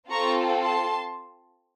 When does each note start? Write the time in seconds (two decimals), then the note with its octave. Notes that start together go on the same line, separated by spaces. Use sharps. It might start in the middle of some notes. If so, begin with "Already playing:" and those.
0.10 C4 F4 A4 A#5 C#6
0.62 A5 C6